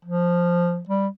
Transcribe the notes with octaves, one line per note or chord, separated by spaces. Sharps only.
F3
G3